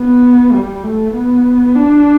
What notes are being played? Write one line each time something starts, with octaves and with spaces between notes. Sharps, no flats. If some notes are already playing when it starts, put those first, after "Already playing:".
Already playing: B3
G3
A3
B3
D4